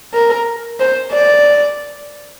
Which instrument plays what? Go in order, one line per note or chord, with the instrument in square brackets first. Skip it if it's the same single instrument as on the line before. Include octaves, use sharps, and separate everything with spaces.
[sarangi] A#4
C5
D5